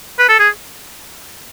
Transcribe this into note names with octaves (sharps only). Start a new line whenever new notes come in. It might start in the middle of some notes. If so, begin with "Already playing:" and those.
B4
A4
G#4